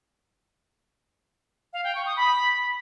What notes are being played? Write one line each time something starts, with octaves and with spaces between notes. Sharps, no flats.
F5
G5
C#6
D#6
B5